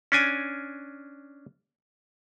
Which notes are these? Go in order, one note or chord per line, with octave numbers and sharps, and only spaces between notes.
C#4 D4 G#5